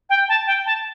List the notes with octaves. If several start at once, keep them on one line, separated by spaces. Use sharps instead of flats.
G5
A5
G5
A5